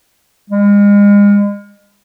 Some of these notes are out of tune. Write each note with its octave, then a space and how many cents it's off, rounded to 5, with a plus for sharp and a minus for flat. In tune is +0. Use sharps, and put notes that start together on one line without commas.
G#3 -35